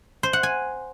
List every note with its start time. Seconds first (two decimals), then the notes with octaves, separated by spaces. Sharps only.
0.23 C5
0.33 F#5
0.43 G#5